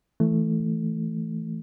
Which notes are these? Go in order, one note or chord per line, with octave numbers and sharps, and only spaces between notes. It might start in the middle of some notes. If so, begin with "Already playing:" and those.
E3 A3